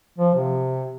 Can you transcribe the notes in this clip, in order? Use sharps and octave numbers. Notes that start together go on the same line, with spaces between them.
F3
C3